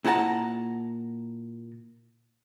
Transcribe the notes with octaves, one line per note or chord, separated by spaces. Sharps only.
A#2 E4 F#5 A5 A#5